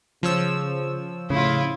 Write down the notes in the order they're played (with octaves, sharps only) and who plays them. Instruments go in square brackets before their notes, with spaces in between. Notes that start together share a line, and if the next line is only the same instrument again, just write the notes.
[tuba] C#3 [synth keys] F3 C#5 E6
[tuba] A2 [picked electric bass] C#3 [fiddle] E4 F4